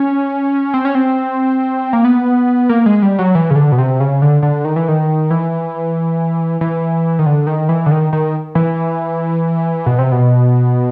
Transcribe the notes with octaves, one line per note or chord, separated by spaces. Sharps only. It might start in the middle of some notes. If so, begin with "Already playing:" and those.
Already playing: C#4
C4
C#4
C4
A#3
B3
A#3
G#3
G3
F#3
E3
C#3
D3
B2
C3
C#3
D3
D3
D#3
E3
D#3
E3
E3
D#3
D3
D#3
E3
D3
D#3
D#3
E3
B2
C3
B2